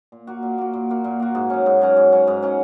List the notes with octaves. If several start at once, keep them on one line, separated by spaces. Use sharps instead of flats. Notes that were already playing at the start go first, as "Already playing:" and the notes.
A#2
A#3 F#4
A#2
A#3 F#4
A#2
A#3 F#4
A#2
A#3 F#4
G#2
F#3 C#4
G#2
F#3 C#4
G#2
F#3 C#4
G#2
F#3 C#4